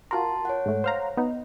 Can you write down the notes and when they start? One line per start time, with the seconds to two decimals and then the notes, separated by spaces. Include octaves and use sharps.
0.11 F4 F#4 A#4 A5 C6
0.45 C#5 F#5
0.66 G#2 A3
0.84 C5 F5 A#5
1.17 B3 D#4